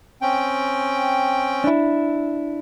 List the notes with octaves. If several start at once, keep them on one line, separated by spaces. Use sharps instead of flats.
C4 C#4 G5
D4 E4